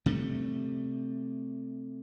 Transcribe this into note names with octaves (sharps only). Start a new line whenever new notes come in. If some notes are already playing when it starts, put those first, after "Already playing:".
C3 G3 A3